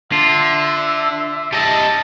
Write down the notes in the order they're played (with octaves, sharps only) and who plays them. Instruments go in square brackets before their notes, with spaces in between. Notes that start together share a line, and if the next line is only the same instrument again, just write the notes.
[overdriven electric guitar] D3 [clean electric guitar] F4 [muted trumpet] E5
[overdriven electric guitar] G3 D#5 [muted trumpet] A5